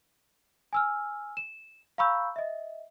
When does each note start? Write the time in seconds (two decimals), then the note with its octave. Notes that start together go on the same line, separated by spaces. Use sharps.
0.73 G#5 E6 F6
1.37 E7
1.98 F5 A#5 B5 C#6 E6 G6
2.36 D#5 E5